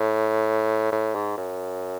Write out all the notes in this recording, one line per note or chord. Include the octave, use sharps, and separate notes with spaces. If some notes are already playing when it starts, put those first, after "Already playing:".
Already playing: A2
A2
G#2
F#2